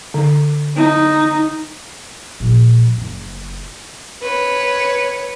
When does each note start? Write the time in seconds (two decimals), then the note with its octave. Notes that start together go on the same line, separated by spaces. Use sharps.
0.14 D3
0.76 D#4
2.40 A#1
2.98 F#1
4.22 B4 C#5